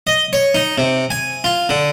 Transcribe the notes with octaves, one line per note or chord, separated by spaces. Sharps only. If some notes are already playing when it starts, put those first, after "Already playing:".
D#5
C#5
D#4
C3
G#5
F4
D3